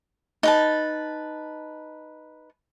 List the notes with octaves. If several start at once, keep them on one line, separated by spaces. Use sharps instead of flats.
D#4 B4 A5